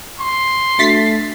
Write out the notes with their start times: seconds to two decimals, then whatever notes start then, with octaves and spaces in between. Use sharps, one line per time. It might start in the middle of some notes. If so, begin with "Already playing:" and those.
0.19 C6 C#6
0.79 A3 D4 F#4 E5 A6 B6 C7